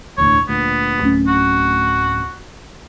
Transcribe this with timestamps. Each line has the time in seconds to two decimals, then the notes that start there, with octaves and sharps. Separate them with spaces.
0.18 E1 D2 A2 C#5
0.49 D2 A#2 B3
1.01 D1 A3 C#4
1.27 F#4